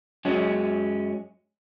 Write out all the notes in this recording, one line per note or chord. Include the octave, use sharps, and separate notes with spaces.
F#2 F#3 G#3 C#4